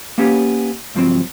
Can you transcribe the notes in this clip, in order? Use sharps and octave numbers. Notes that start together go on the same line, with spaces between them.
A#3 B3 C#4 G4
C#2 G2 F3 F#3 C4